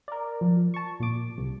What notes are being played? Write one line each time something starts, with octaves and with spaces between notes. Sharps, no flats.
A#4 D5
F3
A5 C#6
A#2 D6
C2